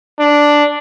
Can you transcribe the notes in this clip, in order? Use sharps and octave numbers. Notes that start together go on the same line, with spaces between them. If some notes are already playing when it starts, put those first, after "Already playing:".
D4